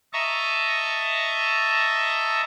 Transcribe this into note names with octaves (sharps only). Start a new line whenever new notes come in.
D#5 E5 A5 A#5 C#6